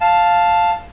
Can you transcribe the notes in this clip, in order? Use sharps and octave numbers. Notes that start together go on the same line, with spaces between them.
F5 A5